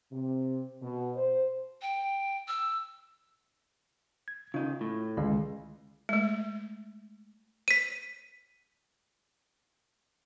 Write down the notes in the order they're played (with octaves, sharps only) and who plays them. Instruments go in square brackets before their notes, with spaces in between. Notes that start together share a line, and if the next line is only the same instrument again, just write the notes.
[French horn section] C3
B2
C5
[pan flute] G5
E6
[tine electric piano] G#6
[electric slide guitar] C#3 D#4 [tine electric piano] F4
[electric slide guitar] A2
[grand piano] C#2 [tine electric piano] D3 D#3 G#3
[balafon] G#3 A3
[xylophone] B6 D#7